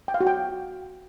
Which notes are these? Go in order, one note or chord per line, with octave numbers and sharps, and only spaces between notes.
G5
F5
F#4
G5